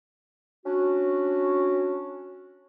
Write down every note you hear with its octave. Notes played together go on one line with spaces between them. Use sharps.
C#4 D4 F#4